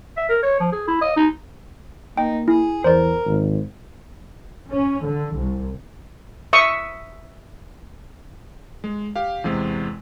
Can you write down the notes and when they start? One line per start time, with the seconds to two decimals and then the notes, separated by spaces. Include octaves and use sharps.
0.17 E5
0.29 A#4
0.43 C#5
0.60 F3
0.72 G#4
0.88 E4
1.01 D#5
1.16 D#4
2.17 A#3 D#4 G5
2.48 E4 G#4
2.84 E2 A#4 C5 D5
3.26 G#1
4.70 C#4
5.05 D3
5.36 C2
6.53 E5 C#6 D#6
8.84 G#3
9.16 G4 F5
9.44 E2 C3 G#3